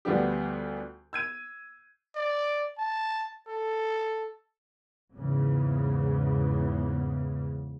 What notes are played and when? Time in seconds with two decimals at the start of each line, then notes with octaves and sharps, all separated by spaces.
0.05 D2 F3 G3 B3 D4 G4
1.13 E6 G#6 D#7
2.15 D5
2.78 A5
3.48 A4
5.14 E2 G#2 C#3